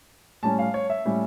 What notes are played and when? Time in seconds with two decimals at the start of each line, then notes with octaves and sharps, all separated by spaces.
0.43 A2 G3 C#4 A5
0.59 F5
0.74 C#5
0.90 E5
1.05 A2 G3 C#4